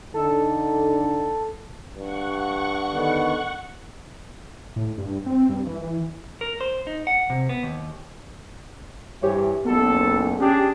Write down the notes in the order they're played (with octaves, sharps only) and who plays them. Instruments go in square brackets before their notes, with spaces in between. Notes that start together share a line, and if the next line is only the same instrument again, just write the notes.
[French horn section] D3 D#4 [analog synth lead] A4
[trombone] G2 [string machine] F#5 C#6
[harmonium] D3 D#3 B3
[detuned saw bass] A2
G2
C4
G2
E3
E3
[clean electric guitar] A#4
C5
D#4
F#5
C3
B3
D#2
[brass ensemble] G2 E3 [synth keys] G4 C5 C#5
[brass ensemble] F#1 B1 [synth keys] B3 [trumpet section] A4
[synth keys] C#4 [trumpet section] D4 G#4 [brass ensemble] G4